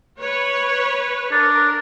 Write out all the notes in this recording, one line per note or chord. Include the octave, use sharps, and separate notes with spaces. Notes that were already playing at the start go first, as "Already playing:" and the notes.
B4 C#5
D4 A#4